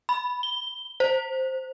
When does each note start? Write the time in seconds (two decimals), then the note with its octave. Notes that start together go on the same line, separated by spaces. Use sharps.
0.09 B5
0.43 G7
1.00 C5